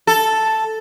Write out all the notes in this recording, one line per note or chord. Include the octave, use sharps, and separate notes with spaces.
A4